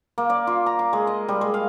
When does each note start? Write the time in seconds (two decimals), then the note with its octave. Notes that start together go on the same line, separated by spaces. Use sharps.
0.18 A#3
0.30 D5
0.47 F4
0.66 A#5
0.79 D6
0.93 G#3
1.07 D#5
1.29 G3
1.41 G#3
1.54 F5